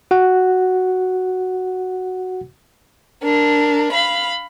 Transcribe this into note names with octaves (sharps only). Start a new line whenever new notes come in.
F#4 F#5
D4 A#4
F5 B5